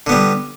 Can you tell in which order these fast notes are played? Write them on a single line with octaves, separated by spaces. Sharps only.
D3 B3 G3